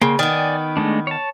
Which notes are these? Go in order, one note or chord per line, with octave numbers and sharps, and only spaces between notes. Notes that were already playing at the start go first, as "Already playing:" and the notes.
C#3 A#3 G5 C6
D#3 B3 D5 G5 G#5
G#3 A3 D4
C#5 A5